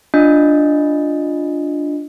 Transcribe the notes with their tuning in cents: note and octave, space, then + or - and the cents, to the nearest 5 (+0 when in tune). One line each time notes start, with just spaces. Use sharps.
D4 +0 F4 +0 D#5 +0